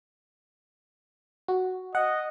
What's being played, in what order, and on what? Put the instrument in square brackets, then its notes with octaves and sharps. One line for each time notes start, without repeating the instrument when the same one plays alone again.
[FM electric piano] F#4
[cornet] D#5 [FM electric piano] F#5